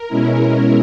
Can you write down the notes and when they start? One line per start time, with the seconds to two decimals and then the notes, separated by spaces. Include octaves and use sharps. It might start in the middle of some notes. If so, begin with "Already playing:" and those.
Already playing: A#4
0.08 B2 G#3 C#4 E4